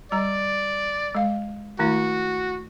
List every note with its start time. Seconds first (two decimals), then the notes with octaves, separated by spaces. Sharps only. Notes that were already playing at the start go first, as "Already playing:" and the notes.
0.12 G3 D5 A#5
1.15 G#3 F5
1.79 D#3 A3 E4 F#4